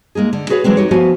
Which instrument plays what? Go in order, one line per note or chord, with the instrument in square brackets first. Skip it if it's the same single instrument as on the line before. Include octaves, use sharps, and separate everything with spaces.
[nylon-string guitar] G#3 A#3 D#4 G#4
D3
F#4 G#4 B4 C#5 F5
E3 F#3 G#3 C4
D#4 F#4 G4 C#5
F3 A3 B3 F#4 F5 G#5